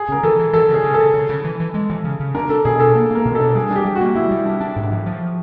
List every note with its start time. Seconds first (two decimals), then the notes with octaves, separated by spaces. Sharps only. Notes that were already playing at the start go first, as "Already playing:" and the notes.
Already playing: G#4
0.09 C#3 A#4
0.23 E3 A4
0.39 E3
0.53 E3 A4
0.69 C#3
0.74 G#4
0.84 C#3
0.94 C#3 A4
1.14 C#3
1.29 C#3
1.44 E3
1.60 E3
1.74 G#3
1.90 E3
2.04 C#3
2.20 C#3
2.35 D4 A#4
2.49 D4 A4
2.65 B2 G#4
2.80 D4 A4
2.95 A#3
3.11 A#3 A#4
3.25 B2
3.35 D4 A4
3.55 G3 G#4
3.71 D4 G4
3.85 G3
3.95 F#4
4.01 A#3
4.15 G3 E4
4.31 G3
4.46 D4
4.60 D4
4.76 G#2
4.92 F3
5.06 F3